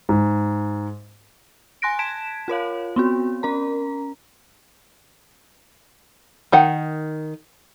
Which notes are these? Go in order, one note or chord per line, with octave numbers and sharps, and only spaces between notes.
G#2
G#5 C6 F#6 A#6 D7
A5 G#6 B6 D7 E7
F4 A#4 C#5 F5
B3 C4 F#4
C#4 A#4 A#5
D#3 D#4 F#5